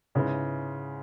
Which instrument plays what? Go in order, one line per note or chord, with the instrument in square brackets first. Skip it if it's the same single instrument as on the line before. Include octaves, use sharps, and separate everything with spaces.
[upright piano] G#2 G#3 B3 E4 [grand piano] C#3